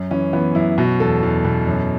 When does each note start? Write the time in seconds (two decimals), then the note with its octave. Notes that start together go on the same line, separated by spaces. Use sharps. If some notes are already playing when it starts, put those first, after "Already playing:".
Already playing: F#2
0.11 E3 C#4
0.33 E3 B3
0.55 F#2 E4
0.78 B2 F#4
1.00 E2 A4
1.23 E2
1.45 B2
1.67 F#2